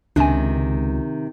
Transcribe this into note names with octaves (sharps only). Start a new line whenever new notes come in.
C#2 C3 D#3 D4 G#5